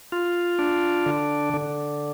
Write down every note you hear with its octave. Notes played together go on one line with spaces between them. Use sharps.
F4
D4
D3
D3